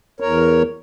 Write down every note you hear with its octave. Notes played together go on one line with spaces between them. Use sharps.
E2 A#4 C#5